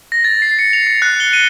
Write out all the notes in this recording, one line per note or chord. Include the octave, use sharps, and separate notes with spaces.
A#6
A6
C7
C#7
F7
C#7
F#6
G7
D#7